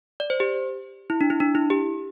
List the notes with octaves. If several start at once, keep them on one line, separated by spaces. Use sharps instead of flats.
D5
C5
G4
E4
D4
E4
D4
E4
G4